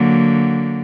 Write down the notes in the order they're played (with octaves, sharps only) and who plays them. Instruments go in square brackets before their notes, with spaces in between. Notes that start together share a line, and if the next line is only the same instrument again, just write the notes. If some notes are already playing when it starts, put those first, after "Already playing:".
Already playing: [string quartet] D3 F#3 A#3